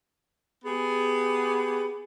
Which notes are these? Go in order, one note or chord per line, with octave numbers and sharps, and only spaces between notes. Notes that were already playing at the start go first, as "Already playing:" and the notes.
B3 G4 G#4